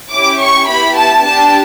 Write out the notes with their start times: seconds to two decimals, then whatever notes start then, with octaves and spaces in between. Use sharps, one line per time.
0.11 C#4 E4 G4 D6
0.39 C#6
0.68 B3 E4 G4 B5
0.96 A5
1.24 D4 G4 A5